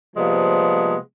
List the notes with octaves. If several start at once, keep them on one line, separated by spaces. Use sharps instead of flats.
C3 F3 G3 G#3 A#3 B3